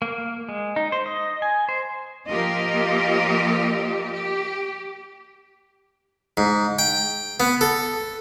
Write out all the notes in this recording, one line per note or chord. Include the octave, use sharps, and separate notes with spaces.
A#3
G#3
D#4
C5
D#5
G#5
C5
F3 A#3 F4 G4 A#4 D#5
G4
G#2
G5
B3
A4